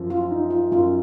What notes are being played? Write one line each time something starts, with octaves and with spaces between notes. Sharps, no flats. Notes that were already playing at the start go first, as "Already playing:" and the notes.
Already playing: F#2 F3
F4
D#4
F4
F#2 F4